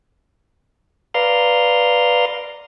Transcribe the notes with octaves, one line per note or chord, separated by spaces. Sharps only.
B4 D5 F5 A#5 C6